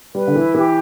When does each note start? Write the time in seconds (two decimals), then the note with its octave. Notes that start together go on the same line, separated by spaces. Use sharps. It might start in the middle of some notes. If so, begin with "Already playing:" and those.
0.15 G3 B4
0.27 D3
0.35 E3 E4
0.54 E3 G4